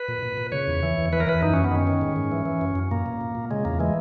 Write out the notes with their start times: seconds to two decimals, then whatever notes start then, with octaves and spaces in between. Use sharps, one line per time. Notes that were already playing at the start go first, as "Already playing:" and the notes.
Already playing: B4
0.08 A#2
0.23 A#2
0.37 A#2
0.52 C#3 C#5
0.67 E2
0.83 E3
0.98 E2
1.13 E3 B4
1.20 A#4
1.27 E3 B4
1.41 F#2 D#4
1.53 F#2 C#4
1.64 B3
1.71 D#3 C#4
1.87 D#3
2.01 G#2
2.16 G#2
2.31 E3
2.46 E3
2.61 F#2
2.75 F#2
2.91 A#2 A#3
3.06 A#2
3.21 A#2
3.35 A#2
3.51 C#3 G#3
3.65 E2 A#3
3.80 E3 G#3